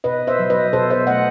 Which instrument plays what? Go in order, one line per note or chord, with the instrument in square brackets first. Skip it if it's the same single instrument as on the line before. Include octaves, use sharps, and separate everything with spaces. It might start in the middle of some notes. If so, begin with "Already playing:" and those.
[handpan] B2 B4 D#5
C5 E5
F#3
B4 D#5
B2 A4 C5
C5 E5
A3 D#5 F#5